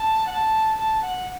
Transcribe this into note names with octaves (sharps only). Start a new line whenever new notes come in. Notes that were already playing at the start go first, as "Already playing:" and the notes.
Already playing: A5
F#5
A5
A5
F#5